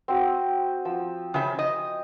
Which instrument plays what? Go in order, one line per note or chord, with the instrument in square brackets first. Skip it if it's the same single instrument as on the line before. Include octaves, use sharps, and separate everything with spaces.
[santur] C4 F#4 D#6
F3 E6
[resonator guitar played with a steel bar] C#3 E5 [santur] G5 G#5 C6
[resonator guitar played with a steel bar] D#5